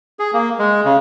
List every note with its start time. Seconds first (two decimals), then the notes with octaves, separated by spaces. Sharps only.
0.19 G#4
0.34 A#3
0.59 G#3
0.85 C#3